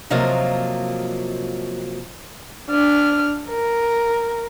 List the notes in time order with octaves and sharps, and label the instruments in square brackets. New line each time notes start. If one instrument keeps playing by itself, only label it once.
[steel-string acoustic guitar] C3 F3 F#3 A#3 F4 D#5
[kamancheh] D4 F6
A#4